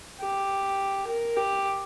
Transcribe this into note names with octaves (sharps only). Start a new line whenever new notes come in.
G4
A#4
G4